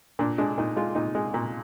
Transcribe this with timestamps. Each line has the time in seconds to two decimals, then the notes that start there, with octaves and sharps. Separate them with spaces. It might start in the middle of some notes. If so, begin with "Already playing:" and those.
0.19 A#2 D4
0.38 G#3 D4
0.58 A#2 D#4
0.77 G#3 F4
0.95 A#2 D#4
1.15 G#3
1.34 A#2